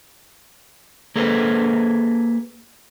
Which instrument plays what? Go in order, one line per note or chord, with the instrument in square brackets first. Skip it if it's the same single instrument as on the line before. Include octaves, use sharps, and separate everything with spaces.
[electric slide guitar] A#3 G#4 A4 B4 C5